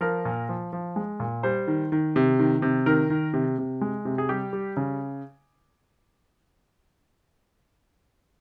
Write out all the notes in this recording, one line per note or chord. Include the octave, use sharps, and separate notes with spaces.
F3 A#4
A#2
F3
F3
G#3
A#2
G3 C5
D#3
D#3
C3
D#3
C3
D#3 A#4
D#3
C3
C3
G#3
C3
G#4
G3 G4
G3
C#3